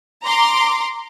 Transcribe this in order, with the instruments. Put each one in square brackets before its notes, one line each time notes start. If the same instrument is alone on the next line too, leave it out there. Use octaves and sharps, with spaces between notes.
[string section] A#5 C6 D6